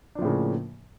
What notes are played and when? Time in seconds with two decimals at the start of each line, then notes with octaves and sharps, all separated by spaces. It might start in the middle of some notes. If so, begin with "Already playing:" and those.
0.15 D4
0.19 F3
0.22 A2
0.25 C#3
0.28 A#3